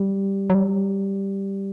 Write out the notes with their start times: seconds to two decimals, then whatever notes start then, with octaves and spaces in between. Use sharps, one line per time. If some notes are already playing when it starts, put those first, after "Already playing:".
Already playing: G3
0.50 F#3
0.55 G3